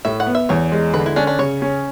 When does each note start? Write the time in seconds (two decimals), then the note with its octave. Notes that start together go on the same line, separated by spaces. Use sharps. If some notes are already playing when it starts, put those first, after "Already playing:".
0.05 A2 E5
0.20 F#5
0.27 B3
0.35 E5
0.49 E2 C#5
0.72 G#3
0.94 D3 B4
1.06 E4
1.16 C#4 D4
1.27 D4
1.39 C#3 C#5
1.62 C#4